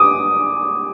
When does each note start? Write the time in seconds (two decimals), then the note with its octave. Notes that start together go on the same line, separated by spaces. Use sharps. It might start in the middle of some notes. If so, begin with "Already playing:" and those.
Already playing: D6 D#6